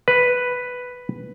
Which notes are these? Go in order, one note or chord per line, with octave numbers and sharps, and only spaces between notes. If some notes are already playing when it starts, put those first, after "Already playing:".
B4